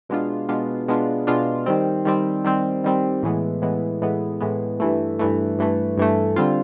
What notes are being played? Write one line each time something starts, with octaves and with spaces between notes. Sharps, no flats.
B2 G#3 B3 D4 F4
B2 G#3 B3 D4 F4
B2 G#3 B3 D4 F4
B2 G#3 B3 D4 F4
D#3 G3 C4
D#3 G3 C4
D#3 G3 C4
D#3 G3 C4
A2 E3 G#3 B3
A2 E3 G#3 B3
A2 E3 G#3 B3
A2 E3 G#3 B3
G2 E3 A3
G2 E3 A3
G2 E3 A3
G2 E3 A3
D3 G3 C4 F4